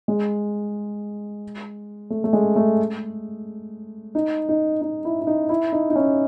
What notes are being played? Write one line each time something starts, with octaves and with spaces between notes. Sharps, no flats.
G#3
A3
A3
G#3
A3
D#4
D#4
D#4
E4
E4
D#4
E4
D#4
D#4
C#4